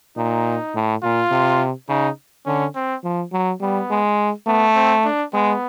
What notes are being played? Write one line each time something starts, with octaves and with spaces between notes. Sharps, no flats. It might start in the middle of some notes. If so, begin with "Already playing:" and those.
A#2 D#4
A2
A#2 F4
C3
C#3 D#4
D3 C#4
C4
F3
F#3
G3 B3
G#3
A3 B3
C4
D4
G#3 B3